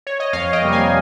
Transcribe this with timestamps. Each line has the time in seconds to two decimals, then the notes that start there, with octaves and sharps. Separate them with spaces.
0.07 C#5
0.20 D#5
0.33 F2 C#5 F5
0.53 D#5 G5
0.62 C3 G3 A#3
0.72 F5 G#5